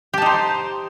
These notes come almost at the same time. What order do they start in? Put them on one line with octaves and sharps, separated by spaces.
G4 A5 D#4 C5